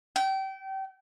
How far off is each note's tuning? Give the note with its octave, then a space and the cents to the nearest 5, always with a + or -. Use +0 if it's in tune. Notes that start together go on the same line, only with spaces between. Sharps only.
G5 -30